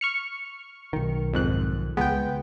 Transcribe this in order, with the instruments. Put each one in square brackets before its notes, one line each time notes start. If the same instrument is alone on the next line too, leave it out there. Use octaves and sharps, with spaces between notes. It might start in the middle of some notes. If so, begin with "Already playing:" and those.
[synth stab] C#6 F6 C#7
[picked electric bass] B1 D#3
[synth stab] F2 G#2 F#6
[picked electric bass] C#2 G#3 [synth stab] B3 G5